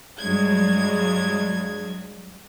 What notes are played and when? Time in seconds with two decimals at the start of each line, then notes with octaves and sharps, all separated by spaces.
0.20 G2 F#3 G#3 G#6